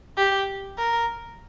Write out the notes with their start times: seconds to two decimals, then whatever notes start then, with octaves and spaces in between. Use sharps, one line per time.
0.17 G4
0.79 A#4